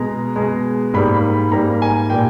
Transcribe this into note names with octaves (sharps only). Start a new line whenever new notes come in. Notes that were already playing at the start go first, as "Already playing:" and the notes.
Already playing: B2 G#3 A#5
B2 G#3
G#2 G3 A#3 B5
G#2 G3 A#3 A#5
G#5
A#2 G3 A#3 G5